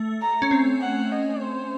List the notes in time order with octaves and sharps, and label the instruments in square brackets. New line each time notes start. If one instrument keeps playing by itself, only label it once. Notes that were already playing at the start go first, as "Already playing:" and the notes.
Already playing: [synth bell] A3
[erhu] A#5
[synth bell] C#4
C4
[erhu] F#5
D#5
C5